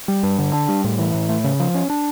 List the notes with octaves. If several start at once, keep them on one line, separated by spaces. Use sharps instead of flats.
G3
G2
D3
D4
G3
A2
E3
A2
A3
C#3
F3
C#4
D4